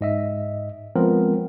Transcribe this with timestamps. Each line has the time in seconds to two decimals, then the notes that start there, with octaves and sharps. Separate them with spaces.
0.01 G#2 D#5 E5
0.96 F3 G#3 B3 C4 A#4